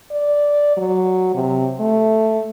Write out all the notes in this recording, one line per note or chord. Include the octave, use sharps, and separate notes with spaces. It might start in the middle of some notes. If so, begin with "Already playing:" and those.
D5
F#3
C3
A3